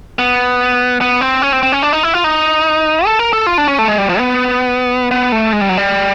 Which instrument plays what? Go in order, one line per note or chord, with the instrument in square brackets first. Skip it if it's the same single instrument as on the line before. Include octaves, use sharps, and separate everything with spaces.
[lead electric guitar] B3
B3
C4
C#4
C4
C4
C#4
D4
D#4
E4
F4
D#4
A4
A#4
A4
F4
D4
C#4
A3
G#3
G3
F3
B3
B3
A3
G#3
G3
F#3
G3